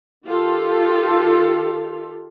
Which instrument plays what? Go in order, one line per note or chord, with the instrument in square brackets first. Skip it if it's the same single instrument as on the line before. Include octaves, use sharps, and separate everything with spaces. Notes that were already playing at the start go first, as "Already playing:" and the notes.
[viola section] D#3 F4 G4 A4